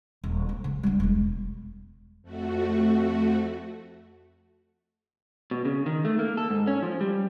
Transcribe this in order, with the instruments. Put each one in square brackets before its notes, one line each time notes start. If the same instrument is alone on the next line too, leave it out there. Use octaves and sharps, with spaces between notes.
[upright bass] D#1
F3
C#3
G3 D4
E1 G3
[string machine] F2 A3 F#4
[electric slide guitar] B2
C#3
D#3
A3
A#3
A4
G#2
C#4
F3
G3